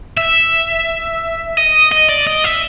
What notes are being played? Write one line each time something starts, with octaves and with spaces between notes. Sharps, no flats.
E5
D#5
D#5
D5
D#5
E5